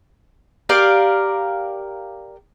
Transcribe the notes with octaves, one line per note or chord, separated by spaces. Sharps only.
G4 A#4 D5 F5